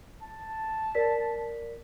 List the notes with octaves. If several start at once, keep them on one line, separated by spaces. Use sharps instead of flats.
A5
A#4 D5 B6